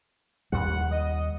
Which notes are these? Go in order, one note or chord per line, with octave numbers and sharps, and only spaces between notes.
D#2 G3 F#5
D#5